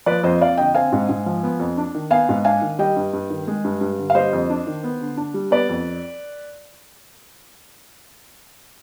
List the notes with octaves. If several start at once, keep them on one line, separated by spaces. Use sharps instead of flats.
F3 B4 D5
F2 C5 D#5
F2 D5 F5
D3 D#5 G5
C4 F5 G#5
G#2
G#2
F3
B3
F2
D4
D#3
B3 F5 G#5
G#2
D4 F5 G#5
D#3
G3 D#5 G5
G2
G2
D#3
G#3
G2
G2
D3
F5
G3 C5 D#5
F2
D4
D#3
B3
D3
D4
G3
B3 B4 D5
F2